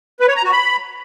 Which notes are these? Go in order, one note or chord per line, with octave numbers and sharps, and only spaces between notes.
B4
C#5
A#5
F#4
B5